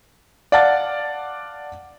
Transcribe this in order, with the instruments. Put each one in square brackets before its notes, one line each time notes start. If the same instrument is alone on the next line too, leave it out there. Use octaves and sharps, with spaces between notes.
[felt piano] D5 F5 F#5 A5 A6